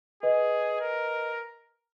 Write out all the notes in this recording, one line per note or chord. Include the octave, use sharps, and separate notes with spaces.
G#4 B4 D#5
A#4